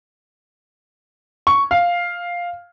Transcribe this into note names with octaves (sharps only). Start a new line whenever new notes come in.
C#6
F5